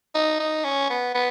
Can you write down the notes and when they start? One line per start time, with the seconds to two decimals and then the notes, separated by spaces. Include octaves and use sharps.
0.15 D#4
0.40 D#4
0.64 C#4
0.90 B3
1.14 B3